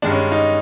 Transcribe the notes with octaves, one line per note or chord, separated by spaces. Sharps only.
G2 D#3 G#3 D4
C#4
D#4